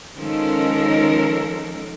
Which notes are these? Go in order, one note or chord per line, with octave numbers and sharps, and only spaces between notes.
D#3 F3 G#3 C#4 A4 A#4